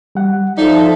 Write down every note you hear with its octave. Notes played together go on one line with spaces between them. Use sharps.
G3 F#5
F3 D#4 A4 D5 E5